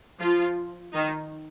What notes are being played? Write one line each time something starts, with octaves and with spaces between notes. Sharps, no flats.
F3 F4
D#3 D#4